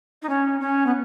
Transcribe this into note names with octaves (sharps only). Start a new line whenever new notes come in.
D#4
C#4
C#4
B3